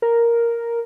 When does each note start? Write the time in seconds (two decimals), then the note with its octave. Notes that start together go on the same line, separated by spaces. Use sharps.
0.02 A#4